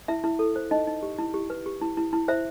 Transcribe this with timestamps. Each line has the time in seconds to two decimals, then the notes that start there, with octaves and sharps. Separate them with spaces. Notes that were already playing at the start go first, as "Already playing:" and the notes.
0.08 E4 E5
0.24 E4
0.39 A4
0.56 C5
0.71 D#4 D#5
0.87 D#4
1.03 G4
1.19 E4
1.34 G4
1.50 B4
1.66 G4
1.81 E4
1.97 E4
2.13 E4
2.28 C5 E5